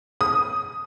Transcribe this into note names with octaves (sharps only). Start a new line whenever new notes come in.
D#6